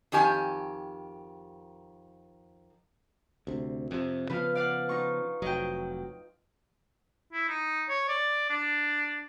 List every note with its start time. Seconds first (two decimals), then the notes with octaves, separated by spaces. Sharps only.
0.12 F2 D#3 G4 G#5
3.47 D2 C3
3.91 F2 C3
4.30 C#3 F3 B3 B4 F5
4.55 D5 F5 F#5
4.89 D#4 F4 C#6
5.42 F1 F#3 D#5 G5
7.33 E4
7.49 D#4
7.89 C#5
8.09 D5
8.50 D4